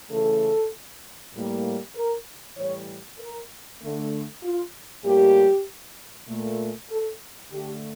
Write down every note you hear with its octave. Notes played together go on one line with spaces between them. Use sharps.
C#3 E3 A3 A4
A2 G3 A#3
A#4
A2 E3 G3 C#5
A#4
D3 A3
F4
A2 G3 A#3 G4
A#2 A3
A4
D3 A3 G4